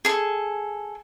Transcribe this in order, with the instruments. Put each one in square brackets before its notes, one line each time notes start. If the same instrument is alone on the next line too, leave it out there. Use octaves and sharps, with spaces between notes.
[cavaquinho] G#4 A4